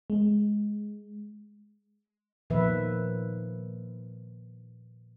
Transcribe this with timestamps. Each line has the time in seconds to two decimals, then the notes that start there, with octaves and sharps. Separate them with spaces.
0.10 G#3
2.50 A#2 D#3 F3 B4 E5